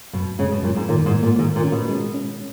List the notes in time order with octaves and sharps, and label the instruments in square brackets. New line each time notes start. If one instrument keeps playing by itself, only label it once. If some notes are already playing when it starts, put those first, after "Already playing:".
[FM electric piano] F#2 [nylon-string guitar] B2
[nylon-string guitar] C#3 [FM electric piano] G#3
[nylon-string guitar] B2
[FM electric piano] F#2 [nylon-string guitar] A#2
[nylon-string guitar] G#2
[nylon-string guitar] A#2 [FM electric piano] D#3
[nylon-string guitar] G#2
[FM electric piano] A#3
[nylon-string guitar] A#2
[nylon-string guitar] G#2 [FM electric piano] D#3
[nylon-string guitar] A#2
[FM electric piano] C#4
[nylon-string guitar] B2
[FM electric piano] G#3
C#4